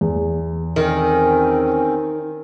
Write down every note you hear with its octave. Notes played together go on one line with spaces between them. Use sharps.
E2
D#3 C4 C#4